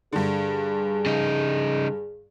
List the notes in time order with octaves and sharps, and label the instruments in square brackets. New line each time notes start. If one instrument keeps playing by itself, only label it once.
[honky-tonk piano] G2 D3 [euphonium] G#4
[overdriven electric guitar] C#3 D#4